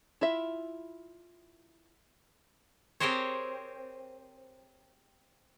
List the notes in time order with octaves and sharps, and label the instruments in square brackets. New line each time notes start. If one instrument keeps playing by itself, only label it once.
[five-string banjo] E4 F4 E5
[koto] C4 G4 G#4 A#4 C5 C#5